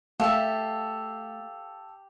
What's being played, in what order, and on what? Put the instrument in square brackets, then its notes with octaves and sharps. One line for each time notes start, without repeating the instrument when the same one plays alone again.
[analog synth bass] A3 [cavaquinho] G4 E5 [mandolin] A4 [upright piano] F5